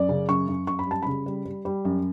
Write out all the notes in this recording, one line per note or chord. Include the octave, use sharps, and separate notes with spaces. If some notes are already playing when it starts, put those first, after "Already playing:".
Already playing: F#2 D5
C#3
F#2 C#6
F#2
F#2 C#6
B5
G3 A5
C#3 B5
G3
G3
G3
F#2